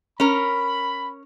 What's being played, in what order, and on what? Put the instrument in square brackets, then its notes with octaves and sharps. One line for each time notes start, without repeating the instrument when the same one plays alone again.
[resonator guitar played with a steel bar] C#4 A#4 [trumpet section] B5